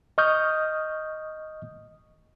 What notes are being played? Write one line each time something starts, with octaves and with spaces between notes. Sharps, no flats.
D#5 C#6 D#6 F6 G6